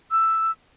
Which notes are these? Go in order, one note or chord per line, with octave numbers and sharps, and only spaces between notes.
E6